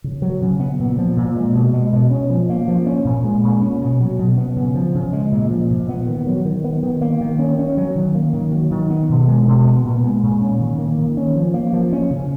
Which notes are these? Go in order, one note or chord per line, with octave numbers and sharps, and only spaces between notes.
C#3
F#3
C#3
B3
A#2
F3
A#2
G#3
B2
G#3
B2
C#4
F3
A#3
F3
C#4
A#2
G#3
A#2
C#4
B2
F#3
B2
B3
C#3
F3
C#3
G#3
A#2
F3
A#2
B3
D#3
F#3
D#3
B3
D#3
A#3
D#3
C#4
C#4
F#3
D#3
A#3
D#3
F#3
D#3
B3
B2
G#3
B2
B3
A#2
G#3
A#2
C#4
D#3
A#3
D#3
C#4
F3
A#3
F3
C#4
C#3